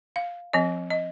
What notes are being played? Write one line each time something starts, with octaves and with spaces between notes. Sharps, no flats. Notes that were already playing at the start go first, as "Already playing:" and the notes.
F5
F3 C4 D#5
D#5